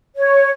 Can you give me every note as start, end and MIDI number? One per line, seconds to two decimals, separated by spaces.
0.17 0.51 73